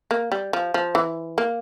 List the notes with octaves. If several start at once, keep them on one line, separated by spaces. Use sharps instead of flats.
A#3
G3
F3
F3
E3
A#3